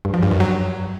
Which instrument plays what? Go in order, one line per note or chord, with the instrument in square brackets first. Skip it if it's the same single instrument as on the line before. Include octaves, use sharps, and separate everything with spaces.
[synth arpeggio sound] G2
F3
G2
F#2
F#3